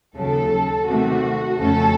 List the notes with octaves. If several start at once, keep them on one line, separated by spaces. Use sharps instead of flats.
D#2 C#3 F#3 A4
C3 D#3 A3 F#4
F2 C#3 A3 C#4 A4